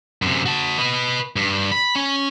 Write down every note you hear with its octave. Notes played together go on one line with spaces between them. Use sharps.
F#2 C3
F#4 A5
B4 D#5
G2
B5
C#4